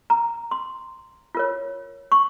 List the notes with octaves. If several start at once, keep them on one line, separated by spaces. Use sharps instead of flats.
A#5
C6
F4 A#4 C#5
C#6